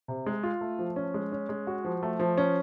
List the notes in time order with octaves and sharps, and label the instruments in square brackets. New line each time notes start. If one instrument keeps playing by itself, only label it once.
[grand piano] C3
G#3
F4
A3
F3
C#4
G#3
C#4
G#3
F#4
F3
A3
F3
C#4